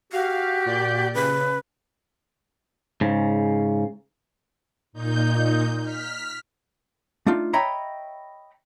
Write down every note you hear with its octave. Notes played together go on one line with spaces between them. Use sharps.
F#4 G4 F5
A#2 D5 G6
C#3 B4
G#2 C#3
A#2 D#4 G6
F6 B6
A3 D4 D#4 F4
C#5 D#5 E5 G5 A#5 B5